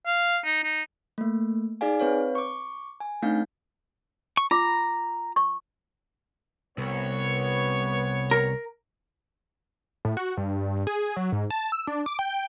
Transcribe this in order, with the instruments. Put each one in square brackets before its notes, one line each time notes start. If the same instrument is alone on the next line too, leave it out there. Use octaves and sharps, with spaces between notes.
[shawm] F5
D#4
D#4
[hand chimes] A3 A#3
D#4 G#4 D5 F5 G#5
C4 B4 C#5 F5
C#6 D6
G#5
A3 C4 D4 D#4 F5 G6
[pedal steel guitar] C#6
[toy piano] F4 B5 D6 [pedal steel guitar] A#5
[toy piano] C#6
[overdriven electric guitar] C2 [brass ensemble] B3 C#5
[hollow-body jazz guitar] A#4
[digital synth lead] A2
F#4
G2
G#4
F#3
G#2
A5
E6
D4
D6
G5